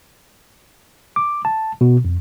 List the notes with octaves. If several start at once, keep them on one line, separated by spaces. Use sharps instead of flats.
D6
A5
B2
F2